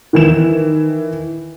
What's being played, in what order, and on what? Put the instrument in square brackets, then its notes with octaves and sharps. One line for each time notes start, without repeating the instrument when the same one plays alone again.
[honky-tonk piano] D#3 E3 E7